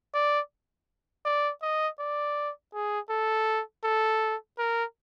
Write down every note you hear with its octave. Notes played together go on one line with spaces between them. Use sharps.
D5
D5
D#5
D5
G#4
A4
A4
A#4